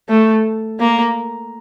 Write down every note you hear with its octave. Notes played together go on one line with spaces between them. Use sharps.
A3
A#3